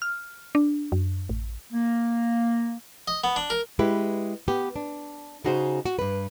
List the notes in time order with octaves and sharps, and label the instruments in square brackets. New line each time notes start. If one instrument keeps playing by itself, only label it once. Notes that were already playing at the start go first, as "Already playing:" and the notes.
[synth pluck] F6
D4
F#2
A1
[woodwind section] A#3
[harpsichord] D#5
B3
D4
A#4
[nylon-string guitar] G#3 E4 G4 B4
B3 G4
D4
C#3 D#4 F#4 G#4 C5
F#4
G2 B4